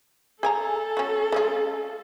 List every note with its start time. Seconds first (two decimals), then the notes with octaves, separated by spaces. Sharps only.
0.43 G#4 A4 G#5 A#5
0.97 C#4 F#4
1.32 G#3 C#4 F4